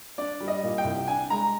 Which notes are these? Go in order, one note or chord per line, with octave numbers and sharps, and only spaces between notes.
D4 D5
G3
D#5
A#2
G5
C2
D4 G#5
G#3 A#5